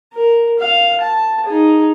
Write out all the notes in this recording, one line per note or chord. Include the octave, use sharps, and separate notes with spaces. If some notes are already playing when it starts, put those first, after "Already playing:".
A#4
F5
A5
D#4 G#4